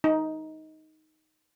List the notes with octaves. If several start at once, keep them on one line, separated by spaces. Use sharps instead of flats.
D#4